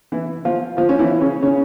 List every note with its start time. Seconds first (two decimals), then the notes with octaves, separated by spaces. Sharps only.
0.12 E3 E4
0.45 F3 F4
0.77 F3 F4
0.89 C#4
0.99 E3 E4
1.21 C#3 C#4
1.43 C#3 C#4